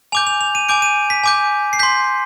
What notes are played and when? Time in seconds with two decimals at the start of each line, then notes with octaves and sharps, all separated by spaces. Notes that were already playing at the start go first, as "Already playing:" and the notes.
0.12 G#5 D6 G6 F7
0.27 F7
0.41 F7
0.55 D#7
0.69 G#5 D6 G6 D7
0.82 D#7
1.10 B6
1.24 G#5 D6 G6
1.73 C7
1.79 C6 G6 B6